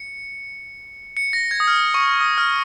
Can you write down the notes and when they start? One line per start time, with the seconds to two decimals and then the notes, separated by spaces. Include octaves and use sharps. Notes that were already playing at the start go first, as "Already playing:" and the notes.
Already playing: C#7
1.17 C#7
1.33 A#6
1.51 G#6
1.60 D#6
1.67 F6
1.94 C#6
2.21 D#6
2.38 F6